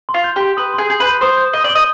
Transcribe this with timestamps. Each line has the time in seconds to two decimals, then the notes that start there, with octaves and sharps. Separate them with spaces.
0.09 C6
0.14 F4
0.24 G6
0.36 G4 C6
0.57 B4 D#6
0.74 G#4 C6
0.89 G#4 G6
1.00 B4
1.06 G6
1.21 C5 D#6
1.37 G6
1.53 D#5 G7
1.64 D5
1.70 G7
1.75 D#5